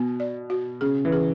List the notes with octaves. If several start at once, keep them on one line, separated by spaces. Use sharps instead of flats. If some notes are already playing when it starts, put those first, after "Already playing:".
Already playing: B2 B3
D5
F#4
C#3 G#4
E3
G#4